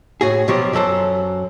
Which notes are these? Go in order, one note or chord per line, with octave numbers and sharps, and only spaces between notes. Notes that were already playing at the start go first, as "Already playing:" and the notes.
A2 F#4 G#4
B2 F3 F#3 F#4 G4
F#2 F#3 A4 C5